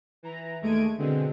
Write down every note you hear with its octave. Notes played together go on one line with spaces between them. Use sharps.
E3 A#5
D#2 G#3 A3 G#6 D7 D#7
B2 D3 G#3 C4